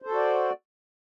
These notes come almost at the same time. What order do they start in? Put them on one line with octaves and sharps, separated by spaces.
C5 A4 F#4 D5